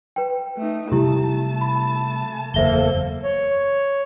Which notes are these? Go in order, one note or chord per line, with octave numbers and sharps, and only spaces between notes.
B4 G5
A3 D#4
C3 G3 A3 E4 G4 A5
B5
F#1 E2 A#3 A4 C5 E5 G7
C#5